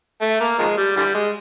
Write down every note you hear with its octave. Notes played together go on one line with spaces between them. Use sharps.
A3
A#3
D#3 F3 G#3
G3
D3 E3 G3
G#3